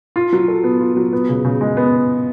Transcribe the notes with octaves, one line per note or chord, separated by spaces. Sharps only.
F4
F#3
A4
B3
F4
F#3
B3
C#3
C#3
G#3
B3